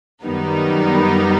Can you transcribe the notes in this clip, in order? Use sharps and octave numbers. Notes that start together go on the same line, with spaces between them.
F#2 D#3 G3 B3 D#4